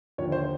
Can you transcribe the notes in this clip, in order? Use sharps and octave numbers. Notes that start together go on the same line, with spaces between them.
D#2 D3 F3 C#5
C5